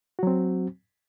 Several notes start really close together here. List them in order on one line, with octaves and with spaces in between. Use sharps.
F#4 F#3 C4